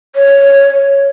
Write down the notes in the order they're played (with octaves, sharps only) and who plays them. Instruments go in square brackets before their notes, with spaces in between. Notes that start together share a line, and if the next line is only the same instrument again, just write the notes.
[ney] C#5